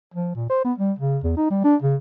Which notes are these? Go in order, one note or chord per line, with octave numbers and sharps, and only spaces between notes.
F3
A#2
C5
B3
G3
C#3
E2
D#4
G3
D4
C#3